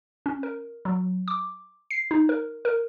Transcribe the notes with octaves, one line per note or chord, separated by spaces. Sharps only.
C#4
A#4
F#3
D6
C7
D#4
A#4
A#4